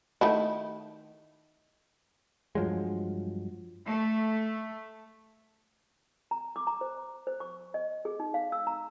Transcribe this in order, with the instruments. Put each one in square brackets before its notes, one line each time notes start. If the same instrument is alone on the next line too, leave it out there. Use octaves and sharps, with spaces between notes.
[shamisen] D#3 A3 E4
[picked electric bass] G2 F3 F#3 G#3
[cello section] A3
[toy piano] A#5
D6
A#5
C5
C5
C#6
D#5
G#4
D#4
F5
E6
A#5